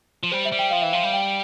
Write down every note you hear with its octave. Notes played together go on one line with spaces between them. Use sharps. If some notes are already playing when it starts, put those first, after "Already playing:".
F3
G3 C5
E5
G3
G5
F3 F5
E3 E5
F3 F5
G3
G5